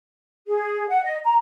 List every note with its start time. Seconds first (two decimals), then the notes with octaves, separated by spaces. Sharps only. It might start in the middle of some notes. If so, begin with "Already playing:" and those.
0.46 G#4
0.88 F#5
1.03 D#5
1.24 A#5